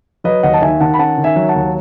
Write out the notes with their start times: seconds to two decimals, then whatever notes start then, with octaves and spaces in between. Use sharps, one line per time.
0.24 F#3 B4 D#5
0.43 D#2 D#5 F#5
0.53 A5
0.61 D#3 E5 G#5
0.80 D#3 F#5 A5
0.94 B5
0.99 C#4 F#5 A5
1.18 D#3
1.24 E5 G#5
1.36 F#3
1.49 F#5 A5
1.55 D#2